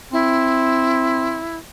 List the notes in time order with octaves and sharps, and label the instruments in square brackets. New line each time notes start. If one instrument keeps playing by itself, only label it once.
[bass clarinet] C4 [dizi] E4